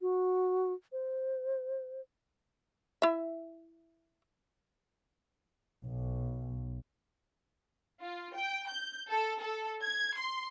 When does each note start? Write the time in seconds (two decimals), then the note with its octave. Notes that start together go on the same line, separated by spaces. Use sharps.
0.01 F#4
0.92 C5
3.02 E4 E5
5.83 B1
8.01 F4
8.34 G5
8.69 G6
9.10 A4
9.39 A4
9.82 G#6
10.17 C6